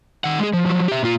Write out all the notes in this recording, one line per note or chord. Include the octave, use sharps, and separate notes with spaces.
D#3 F#5
G#3 G#4
F3
F3 F#3
G4 E5
A#2 F4